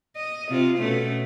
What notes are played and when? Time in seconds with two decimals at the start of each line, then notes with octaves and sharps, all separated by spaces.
0.16 D#5
0.49 C3 C4 F4
0.78 B2 A3 C#4